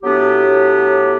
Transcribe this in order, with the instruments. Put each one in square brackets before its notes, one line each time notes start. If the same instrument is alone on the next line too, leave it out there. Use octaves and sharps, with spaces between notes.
[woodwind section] A2 F#3 B3 D4 G4